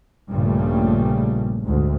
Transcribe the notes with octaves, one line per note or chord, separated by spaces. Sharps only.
A#1 G2 A#2 C#3 G3 A3
D2 G#2